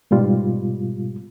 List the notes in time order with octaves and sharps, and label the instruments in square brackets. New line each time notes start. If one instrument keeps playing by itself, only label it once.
[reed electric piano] G#2 B2 G3 F4